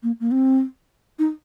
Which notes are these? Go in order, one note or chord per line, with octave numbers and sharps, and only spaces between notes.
A#3
A#3
C4
D#4